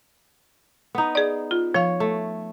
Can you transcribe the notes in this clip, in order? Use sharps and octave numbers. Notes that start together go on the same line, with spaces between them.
B3 D#4
G#4 D5
F4
F3 C#5 F5
A3